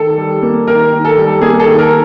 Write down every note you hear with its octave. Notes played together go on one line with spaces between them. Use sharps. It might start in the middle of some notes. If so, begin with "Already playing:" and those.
Already playing: D#3 A4
G3
A#3
D#3 A#4
D#3
A4
G3
A#3 G#4
A4
D#3
A#4